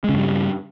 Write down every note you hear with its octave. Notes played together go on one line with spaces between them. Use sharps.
G2 C#3 G3 G#3